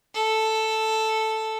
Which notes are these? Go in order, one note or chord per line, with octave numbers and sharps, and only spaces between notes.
A4